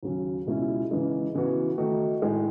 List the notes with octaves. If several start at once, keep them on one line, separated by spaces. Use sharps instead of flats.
D#2 C#3 F#3 C#4
C#2 B2 G#3 C#4 E4
C#3 E3 G#3 D#4
C#3 E3 B3 F#4
D#3 A3 D#4 F#4
A2 G#3 D#4